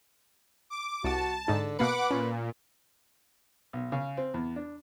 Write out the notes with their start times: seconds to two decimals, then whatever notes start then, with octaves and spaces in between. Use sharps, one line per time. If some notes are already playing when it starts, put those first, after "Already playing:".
0.70 D6
1.04 C2 F#4 A5 D6
1.48 G#2 D3 D#4
1.79 B2 A#3 B4 F#5 D6 C7
2.11 A#2 C#4
3.73 B1
3.92 C#3
4.17 C4
4.34 E2
4.56 D4